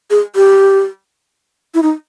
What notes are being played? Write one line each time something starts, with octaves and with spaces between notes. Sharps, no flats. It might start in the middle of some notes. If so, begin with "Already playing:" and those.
G#4
G4
E4
D#4